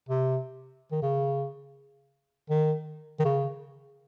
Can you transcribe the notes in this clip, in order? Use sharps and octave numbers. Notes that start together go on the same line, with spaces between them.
C3
D#3
C#3
D#3
D#3
C#3